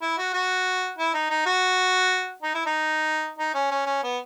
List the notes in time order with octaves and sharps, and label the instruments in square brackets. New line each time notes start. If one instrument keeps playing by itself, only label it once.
[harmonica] E4
F#4
F#4
E4
D#4
D#4
F#4
D#4
E4
D#4
D#4
C#4
C#4
C#4
B3